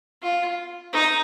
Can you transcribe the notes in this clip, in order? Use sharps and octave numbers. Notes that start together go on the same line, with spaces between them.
F4
D#4